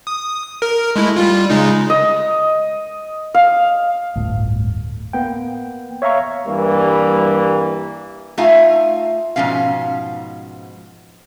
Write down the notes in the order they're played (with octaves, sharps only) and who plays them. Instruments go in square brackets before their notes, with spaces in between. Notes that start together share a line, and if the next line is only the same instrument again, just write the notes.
[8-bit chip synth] D#6
A#4
G#3 A3 E4
G3 F4
C#3 G#3 D#4
[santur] D#5
F5
[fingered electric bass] D1 G1 A2
[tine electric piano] A#3 B3 G5
C#5 E5 F5 A#5 C#6
[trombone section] G2 E3 G3 A#3
[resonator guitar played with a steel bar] A3 D#4 F4 E5 G#5
G#2 B2 F3 C#4 F5